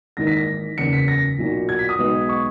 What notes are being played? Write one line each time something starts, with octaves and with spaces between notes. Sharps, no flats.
G#1 G#2 E3 A#3 D#4 A#6
B6
A#6
F#1 E2 C#3 C#7
B6
A#6
B1 A#2 F#3
G#6
B6
D#6
B1 B2 G#3 B3
C#6